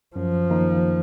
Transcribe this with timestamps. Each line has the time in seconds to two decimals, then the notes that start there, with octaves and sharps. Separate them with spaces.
0.16 F#2 F3
0.50 D#3 A#3 D#4